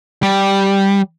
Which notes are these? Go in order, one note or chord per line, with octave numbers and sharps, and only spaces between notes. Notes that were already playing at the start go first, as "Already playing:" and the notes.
G3